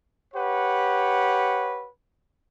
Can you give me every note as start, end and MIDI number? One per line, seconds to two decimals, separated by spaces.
0.35 1.88 67
0.35 1.88 71
0.35 1.88 73
0.35 1.88 78